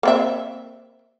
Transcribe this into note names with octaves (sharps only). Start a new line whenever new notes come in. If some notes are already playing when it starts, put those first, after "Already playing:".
A#3 C4 E5